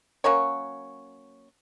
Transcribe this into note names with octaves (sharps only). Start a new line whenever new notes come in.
F#3 A#3 C#4 C#5